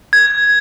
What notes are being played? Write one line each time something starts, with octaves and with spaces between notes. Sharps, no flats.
G#6